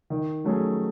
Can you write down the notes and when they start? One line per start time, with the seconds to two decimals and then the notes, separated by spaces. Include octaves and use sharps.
0.10 D#3
0.44 F#3 A3 C#4 G#4